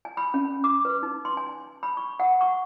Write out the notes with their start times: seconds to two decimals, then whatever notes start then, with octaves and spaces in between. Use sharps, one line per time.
0.05 G#5
0.17 B5
0.34 C#4
0.64 D6
0.85 B4
1.03 D#4
1.25 C6
1.37 G#5
1.83 B5
1.97 C#6
2.20 F#5
2.41 C#6